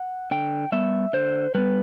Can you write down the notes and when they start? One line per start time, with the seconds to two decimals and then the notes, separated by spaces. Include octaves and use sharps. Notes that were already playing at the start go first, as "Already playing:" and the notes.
Already playing: F#5
0.31 D3 G5
0.72 G3 B3 E5
1.13 D3 C5
1.55 G3 B3 B4